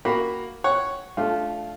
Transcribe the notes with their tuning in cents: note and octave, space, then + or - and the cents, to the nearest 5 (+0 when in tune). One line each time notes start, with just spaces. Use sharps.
A#3 +0 F#4 +0 B5 +0
C#5 +0 F#5 +0
A3 -20 D4 +0 F4 +0